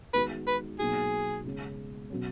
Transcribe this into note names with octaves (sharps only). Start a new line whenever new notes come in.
D#3 G#3 B3 F#4 B4
B4
B2 F#3 A#3 D#4 F#4 G#4
C#3 G#3 C#4
B2 F#3 C#4